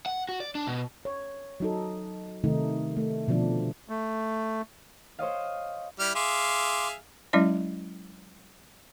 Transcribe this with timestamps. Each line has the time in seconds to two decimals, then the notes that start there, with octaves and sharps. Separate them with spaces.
0.06 F#5
0.29 F#4
0.40 D5
0.55 D4
0.67 B2
1.05 C#5
1.60 F#3 D#4 A4
2.44 C3 D#3 A3 D#4
2.97 A3
3.28 B2 D3 F3 D4
3.89 A3
5.19 C5 C#5 D#5 F5
6.00 G3 E4 F6
6.15 G#4 E5 F5 C6 D6
7.33 F#3 G#3 C#4 E4 D5 D#5